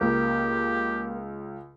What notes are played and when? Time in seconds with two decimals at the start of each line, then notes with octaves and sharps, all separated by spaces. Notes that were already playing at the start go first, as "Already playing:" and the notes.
0.01 C#2 A#3 G4